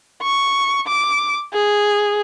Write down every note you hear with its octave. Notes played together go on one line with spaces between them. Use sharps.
C#6
D6
G#4